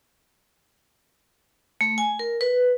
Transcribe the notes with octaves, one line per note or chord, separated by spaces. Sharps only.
A3
G#5
A#4
B4